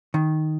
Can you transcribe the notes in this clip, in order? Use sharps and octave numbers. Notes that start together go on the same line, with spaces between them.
D#3